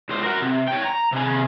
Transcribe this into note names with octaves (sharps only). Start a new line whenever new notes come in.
C#2 C5
F#4 A#4
C3
C#5 G5
A#5
C3 G#4